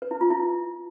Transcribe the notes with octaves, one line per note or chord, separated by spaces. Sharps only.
B4
E4
F4
E4